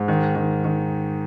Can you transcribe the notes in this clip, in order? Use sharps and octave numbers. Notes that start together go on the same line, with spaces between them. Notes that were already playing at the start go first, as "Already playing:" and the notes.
Already playing: G#2
D#3
D#3
D#3